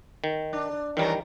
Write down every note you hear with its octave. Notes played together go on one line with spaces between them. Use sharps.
D#3
D4
D#3 E3 G3 C#4 A#4